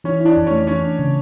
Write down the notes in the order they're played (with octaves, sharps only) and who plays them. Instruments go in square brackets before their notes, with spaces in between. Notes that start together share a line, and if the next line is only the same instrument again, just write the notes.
[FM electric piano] E3 [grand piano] C#4 C#5
[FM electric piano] E4
[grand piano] D4 D5
[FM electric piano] F2
[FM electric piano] A3 [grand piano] C#4 C#5
[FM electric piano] E3 [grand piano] C#4 C#5
[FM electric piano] D4
C#3